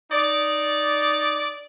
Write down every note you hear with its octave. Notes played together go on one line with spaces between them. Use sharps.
D#4 D5